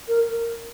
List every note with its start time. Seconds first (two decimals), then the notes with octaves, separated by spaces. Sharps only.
0.08 A#4